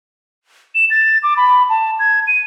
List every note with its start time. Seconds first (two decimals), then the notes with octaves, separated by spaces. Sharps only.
0.75 E7
0.90 A6
1.23 D6
1.37 B5
1.70 A5
1.99 G#6
2.27 D#7